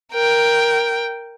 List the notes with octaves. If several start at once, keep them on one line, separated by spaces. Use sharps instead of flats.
A#4 G5